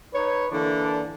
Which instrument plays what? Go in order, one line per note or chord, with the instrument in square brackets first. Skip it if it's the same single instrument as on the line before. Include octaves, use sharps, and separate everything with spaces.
[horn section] D#4 B4 C#5
D3 E3 A#3 D4